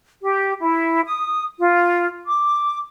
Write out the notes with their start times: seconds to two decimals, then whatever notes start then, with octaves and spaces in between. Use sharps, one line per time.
0.22 G4
0.61 E4
1.06 D#6
1.59 F4
2.27 D6